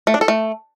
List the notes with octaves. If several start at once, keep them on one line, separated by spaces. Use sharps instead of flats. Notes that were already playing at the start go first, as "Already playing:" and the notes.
A3
D4
A4
A3